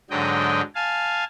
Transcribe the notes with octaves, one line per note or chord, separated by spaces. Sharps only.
G#2 D3 F#3 D#5 G5
F5 G#5 A5